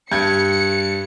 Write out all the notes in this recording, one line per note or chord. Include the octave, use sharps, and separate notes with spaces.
G2 G#6 C#7